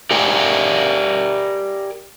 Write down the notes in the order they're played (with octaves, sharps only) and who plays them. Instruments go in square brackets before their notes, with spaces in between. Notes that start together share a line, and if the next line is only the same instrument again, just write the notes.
[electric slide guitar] G4 A#4 D5 G#5